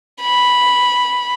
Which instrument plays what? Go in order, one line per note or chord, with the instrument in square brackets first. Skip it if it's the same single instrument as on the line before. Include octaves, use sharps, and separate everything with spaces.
[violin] B5